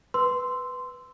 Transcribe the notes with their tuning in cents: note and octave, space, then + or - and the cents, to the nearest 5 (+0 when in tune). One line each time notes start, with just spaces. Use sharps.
B4 +0 C6 -10 E6 +0